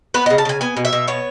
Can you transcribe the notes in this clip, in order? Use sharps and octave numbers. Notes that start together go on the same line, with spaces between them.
B3 B4
C#3 D#5
A5
C#3 G#5
B3 G#5
B2
E5
B2
B3 C#5